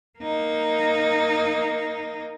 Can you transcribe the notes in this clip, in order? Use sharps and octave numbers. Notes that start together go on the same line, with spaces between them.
A#3 D#4